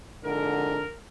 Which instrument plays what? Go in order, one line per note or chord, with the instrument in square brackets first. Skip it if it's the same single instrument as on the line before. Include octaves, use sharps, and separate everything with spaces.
[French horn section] F2 G#2 D3 [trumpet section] A#4